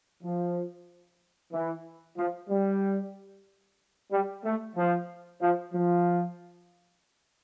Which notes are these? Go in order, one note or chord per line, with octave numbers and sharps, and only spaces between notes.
F3
E3
F3
G3
G3
A3
F3
F3
F3